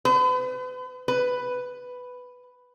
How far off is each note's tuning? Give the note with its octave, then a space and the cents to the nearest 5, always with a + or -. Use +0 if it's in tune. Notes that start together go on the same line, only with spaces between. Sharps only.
B4 +40
B4 +5